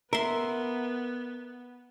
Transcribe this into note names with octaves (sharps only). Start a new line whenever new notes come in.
B3 A#4 E5 C6